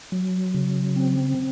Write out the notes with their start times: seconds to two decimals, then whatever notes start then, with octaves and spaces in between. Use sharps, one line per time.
0.12 F#3
0.54 C#3
0.96 C4